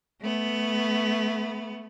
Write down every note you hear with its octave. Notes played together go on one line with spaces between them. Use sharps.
A3 B3